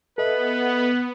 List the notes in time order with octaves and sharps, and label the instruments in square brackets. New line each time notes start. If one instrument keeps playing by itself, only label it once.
[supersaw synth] B3 [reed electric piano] A4 D#5 E5 [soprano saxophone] B4